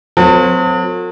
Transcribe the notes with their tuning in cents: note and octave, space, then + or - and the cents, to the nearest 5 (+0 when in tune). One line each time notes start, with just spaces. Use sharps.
F#3 -40 C4 -30 A4 +40